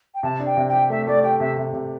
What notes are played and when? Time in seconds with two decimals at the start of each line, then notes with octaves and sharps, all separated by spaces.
0.14 G5
0.23 C3 A5
0.40 D4
0.46 G5
0.57 C3
0.68 G4 G5
0.90 A3 E5
1.07 A3 D5
1.23 G4 G5
1.40 C3 E5
1.57 C3
1.74 C3